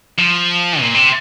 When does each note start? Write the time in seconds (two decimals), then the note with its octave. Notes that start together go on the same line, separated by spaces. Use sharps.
0.19 F3
0.81 A#2
0.95 C3